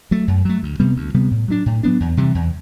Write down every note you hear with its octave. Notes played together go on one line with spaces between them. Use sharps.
F#3 A3
F#2
F#3 A3
D2
C3 G3 B3
D2
C3 G3 B3
A2
F#3 B3 D4
A2
F#3 B3 D4
E2
C3 E3 G3
E2